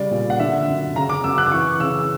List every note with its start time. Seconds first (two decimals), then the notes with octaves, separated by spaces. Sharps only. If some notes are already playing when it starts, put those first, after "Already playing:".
Already playing: C#3 G3 D5
0.11 A#2
0.30 F#5
0.39 D3 E5
0.68 F#2
0.95 C#3 A#5
1.09 D6
1.24 F#2 E6
1.38 F#6
1.46 D6
1.51 E3 C#6
1.80 C#3 E6